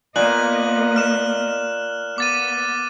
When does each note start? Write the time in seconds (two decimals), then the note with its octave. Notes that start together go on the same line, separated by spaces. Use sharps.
0.16 A#2 A#3 B3 D#5 F#6 F#7
0.96 F6 E7
2.18 B3 D6 A6 D#7